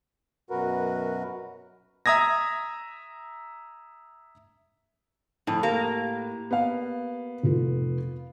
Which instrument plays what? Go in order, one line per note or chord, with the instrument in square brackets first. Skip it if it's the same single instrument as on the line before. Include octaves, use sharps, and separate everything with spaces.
[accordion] F#2 B2 F#4 A#4 B4
[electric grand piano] E5 A#5 D#6 G#6 A#6
[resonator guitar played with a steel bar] F2 [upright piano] A2 A5
[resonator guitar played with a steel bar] A#3 [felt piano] G4
[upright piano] B3 F5
[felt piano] F1 F4